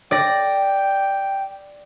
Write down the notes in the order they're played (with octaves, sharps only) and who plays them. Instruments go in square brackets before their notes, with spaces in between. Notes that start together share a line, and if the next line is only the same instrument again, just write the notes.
[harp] D5 A#6 [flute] G5